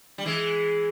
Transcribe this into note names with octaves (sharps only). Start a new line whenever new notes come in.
G3
E3 G#3